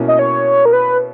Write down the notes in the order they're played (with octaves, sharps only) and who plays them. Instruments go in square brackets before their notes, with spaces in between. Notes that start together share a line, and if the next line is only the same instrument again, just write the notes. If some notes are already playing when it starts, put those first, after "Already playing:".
Already playing: [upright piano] B2 A#3 C#4 E4
[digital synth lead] D#5
C#5
A#4
B4